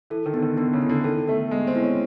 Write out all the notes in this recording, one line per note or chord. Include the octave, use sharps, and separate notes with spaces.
E3 A4
D#3
D3 B3
D#3
D3 B3
C#3
E4
D3
D#3 A4
A3 B3
G#3 B3
C4
E4
C#4